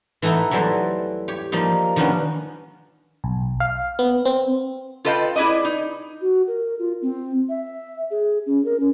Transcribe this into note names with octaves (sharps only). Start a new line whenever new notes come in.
E3 A3 B3 D#4 E4
E2 E3 F#3 G3 A4 C5
G4 C#5
F3 G3 A#3 D#4
D#3 F3 A#3 B3 C#4 D4
B1
F5
B3
C4
F4 A4 B4 D#5 F5 G5
E4 G#4 B4 D5 D#5
D#4
F#4
A#4
F4
C4
E5
G#4
C#4
A#4
C#4